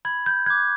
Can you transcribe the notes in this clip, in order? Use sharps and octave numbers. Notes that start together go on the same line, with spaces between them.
B5 G#6
G6
D6 F#6 G#6